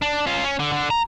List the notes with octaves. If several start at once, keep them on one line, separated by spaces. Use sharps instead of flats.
D4
C#4 F4
C#4
D3
D3
A#5